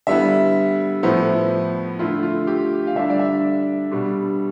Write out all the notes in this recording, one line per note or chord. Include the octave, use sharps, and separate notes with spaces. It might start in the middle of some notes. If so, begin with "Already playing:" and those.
D3 G3 B3 E4 E5
A2 F3 B3 E4
D3 A3 E4 F4
F4
G4
F5
D3 G3 D4 E5
D5
E5
B2 G3 D4